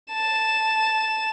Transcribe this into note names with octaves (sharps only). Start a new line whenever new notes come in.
A5 E7